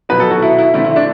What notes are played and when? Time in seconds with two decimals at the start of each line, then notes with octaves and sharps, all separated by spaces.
0.09 B2 F#3 B3 B4
0.20 A4
0.31 F#4
0.42 E4
0.59 E4
0.74 D3 A3 C4 E4
0.84 E4
0.96 D4